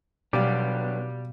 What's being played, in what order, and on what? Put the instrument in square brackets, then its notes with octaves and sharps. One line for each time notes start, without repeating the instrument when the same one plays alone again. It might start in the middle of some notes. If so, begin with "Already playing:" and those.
[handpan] B2 F5 [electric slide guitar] F#3 B3 D4 [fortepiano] G3 [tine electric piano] D6